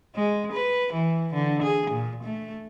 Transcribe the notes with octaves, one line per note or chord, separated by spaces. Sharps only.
G#3
B4
E3
D3
G#4
A#2
A3